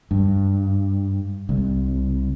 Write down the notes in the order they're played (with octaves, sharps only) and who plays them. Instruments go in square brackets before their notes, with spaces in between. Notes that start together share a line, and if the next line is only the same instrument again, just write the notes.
[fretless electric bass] G2
C2